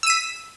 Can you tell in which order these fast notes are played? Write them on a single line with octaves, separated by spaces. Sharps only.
E6 D#7 B6